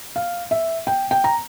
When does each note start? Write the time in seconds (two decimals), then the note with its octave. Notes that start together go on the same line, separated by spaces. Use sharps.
0.16 F5
0.51 E5
0.87 G5
1.11 G5
1.24 A#5